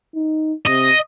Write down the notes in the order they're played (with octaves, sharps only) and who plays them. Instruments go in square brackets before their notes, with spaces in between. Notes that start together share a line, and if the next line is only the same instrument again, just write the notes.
[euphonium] D#4
[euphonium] C3 [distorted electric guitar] D#5